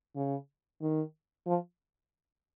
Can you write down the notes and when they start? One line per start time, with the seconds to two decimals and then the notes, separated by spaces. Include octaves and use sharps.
0.16 C#3
0.81 D#3
1.46 F3